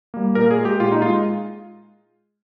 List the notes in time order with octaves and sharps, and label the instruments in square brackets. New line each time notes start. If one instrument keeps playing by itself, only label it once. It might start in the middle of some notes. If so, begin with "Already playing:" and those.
[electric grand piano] G3 A#3
A#2 A#4
G#4
G#3
G4
A#2 F4
D#4
G#3 F4